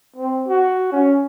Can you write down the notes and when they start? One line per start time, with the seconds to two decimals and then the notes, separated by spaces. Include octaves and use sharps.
0.17 C4
0.48 F#4
0.92 C#4